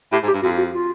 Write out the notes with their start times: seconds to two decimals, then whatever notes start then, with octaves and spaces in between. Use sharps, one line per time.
0.12 A2 G4
0.23 G#2
0.28 G4
0.34 G2
0.43 F2 F#4
0.58 F#4
0.74 F4